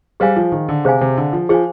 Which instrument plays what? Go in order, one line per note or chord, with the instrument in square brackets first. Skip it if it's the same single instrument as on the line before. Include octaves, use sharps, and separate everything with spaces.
[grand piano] G3 [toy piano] G#4 C5 F5 G#5
[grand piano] F3
D#3
D3
[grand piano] C3 [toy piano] G#4 C5 F5 G#5
[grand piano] C3
D3
F3
[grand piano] F3 [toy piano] G#4 C5 F5 G#5